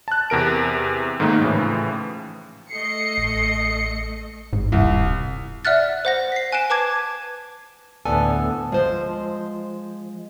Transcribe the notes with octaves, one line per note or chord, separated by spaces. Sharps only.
A5 F#6
E2 C3 A#4 D7
G#2 D#3 A3 A#3 D#4
A2 C#3 E3 F3
A3 D#5 C7 C#7
A1
G#1 G#2
D#1 C2 G2
D5 E5 F#5 F6 F#6 A6
C5 F#5 A#6
B6 C7
G#5 F#6 D7 E7
B4 A5 D6 G#6
D2 A2 B3 D4 A4 G#5
F3 G#3 C5